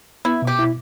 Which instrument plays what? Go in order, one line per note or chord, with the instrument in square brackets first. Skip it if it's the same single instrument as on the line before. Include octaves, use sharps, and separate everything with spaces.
[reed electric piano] B3 [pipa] E4
[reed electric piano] B2
[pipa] G4
[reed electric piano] E4